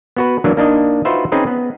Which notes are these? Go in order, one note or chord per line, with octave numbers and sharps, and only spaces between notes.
B3 F#4 B4
E3 F#3 A#3 D4
A#3 D4 D#4 D#5
D#4 F4 F#4 B4 C5 E5
C4 C#4 D#4 G#4 B4
B3